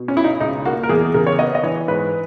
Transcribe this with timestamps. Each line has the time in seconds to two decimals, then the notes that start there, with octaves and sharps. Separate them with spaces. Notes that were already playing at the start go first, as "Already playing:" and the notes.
Already playing: B2
0.08 C#4
0.16 B1 E4
0.24 D#4
0.40 C#2 D#4
0.65 A#3 F#4
0.83 A#4
0.89 E2 G#4
1.01 G#4
1.14 C#3 A#4
1.27 C#5
1.39 B3 D#5
1.55 D#5
1.63 E3 C#5
1.88 G#2 B4